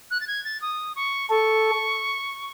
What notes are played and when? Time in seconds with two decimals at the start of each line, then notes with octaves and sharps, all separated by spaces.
0.10 F#6
0.20 A6
0.27 G#6
0.44 A6
0.61 D#6
0.95 C#6
1.30 A4 C#6